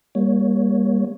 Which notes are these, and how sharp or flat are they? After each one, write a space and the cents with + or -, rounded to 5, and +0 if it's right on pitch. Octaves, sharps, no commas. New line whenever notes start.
G3 +30 A#3 +25 C#5 +0